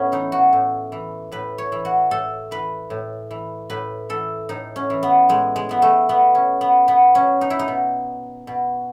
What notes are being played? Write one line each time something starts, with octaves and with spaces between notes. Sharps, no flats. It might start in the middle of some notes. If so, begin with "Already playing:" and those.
Already playing: A2 A3 B3 C#4
E3 D#4
F#4
A2
E3
A2 B4
C#5
E3
F#4
A2 A4
E3 B4
A2
E3
A2 B4
E3 A4
A2 D#4
C#4
E3
B3
A2 G#3
G#3
E3 B3
A3
B2 B3
C#4
B3
B2 B3
C#4
D#4
E4
D#4
B2
B2